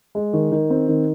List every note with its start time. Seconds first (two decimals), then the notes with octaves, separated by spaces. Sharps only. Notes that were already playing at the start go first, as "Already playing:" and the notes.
0.15 G#3
0.33 D#3
0.52 D#3
0.70 C4
0.88 D#3